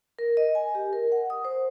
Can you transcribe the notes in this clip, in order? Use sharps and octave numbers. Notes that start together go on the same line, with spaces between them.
A#4
D#5
G#5
G4
A#4
F#5
D#6
C5